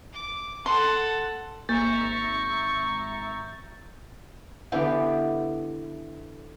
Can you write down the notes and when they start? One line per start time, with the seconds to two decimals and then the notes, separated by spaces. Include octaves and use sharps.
0.13 D6
0.66 A4 F#5 C6
1.69 G#1 A#3 E5 A#5 C#6 G6 A6
4.72 D3 E3 B3 G4